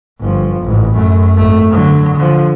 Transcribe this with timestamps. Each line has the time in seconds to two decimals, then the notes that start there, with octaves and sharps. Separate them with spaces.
0.21 G1 F3
0.63 A1 G#2
0.95 F#2 A3
1.37 G#1 A3
1.71 D3 F#3
2.17 D3 F3